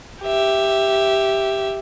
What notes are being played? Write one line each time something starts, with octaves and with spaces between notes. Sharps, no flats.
G4 E5